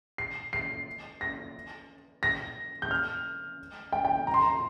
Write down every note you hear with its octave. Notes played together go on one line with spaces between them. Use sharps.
C7
C7
A#6
A#6
G6
F6
G5
G5
A#5
C6
A#5